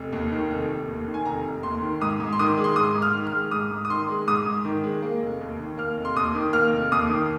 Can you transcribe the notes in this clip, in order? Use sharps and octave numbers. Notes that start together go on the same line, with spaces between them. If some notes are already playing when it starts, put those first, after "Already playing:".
Already playing: F1
D#2
D#3
F1
F1
D#2
D#3
G#5
F1 A#5
F1
D#2 C6
D#3
G#2 D#6
G#2
C6
D#3 D#6
G#3
C6
G#2 D#6
G#2
F6
D#3
F6
G#3
G#2 D#6
G#2
D#6
D#3 C6
G#3
G#2 D#6
G#2
D#3
G#3
A#3
F1
D#2
D#3
A#3 F6
F1
C6
D#2 D#6
D#3
A#3 F6
F1
D#2 D#6
D#3